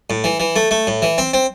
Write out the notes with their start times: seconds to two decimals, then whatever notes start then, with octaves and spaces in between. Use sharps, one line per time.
0.10 A2
0.24 E3
0.40 E3
0.56 A3
0.71 A3
0.87 A2
1.02 E3
1.18 C4
1.33 C4